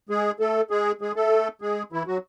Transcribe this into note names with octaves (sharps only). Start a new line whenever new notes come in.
G#3 G#4
A3 A4
G#3 G#4
G#3 G#4
A3 A4
G#3 G#4
E3 E4
F#3 F#4